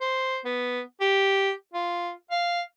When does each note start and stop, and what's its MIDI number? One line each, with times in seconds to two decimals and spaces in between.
0.01 0.39 72
0.45 0.81 59
1.01 1.52 67
1.74 2.12 65
2.31 2.61 77